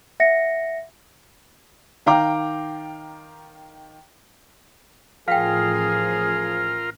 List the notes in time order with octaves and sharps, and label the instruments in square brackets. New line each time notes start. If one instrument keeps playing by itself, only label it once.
[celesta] E5 F#5 A#6 C#7
[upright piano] D#3 F5 G5 A#5 D6
[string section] A1 [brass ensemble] F3 G#4 [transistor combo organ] F4 A#4 [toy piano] F5 G5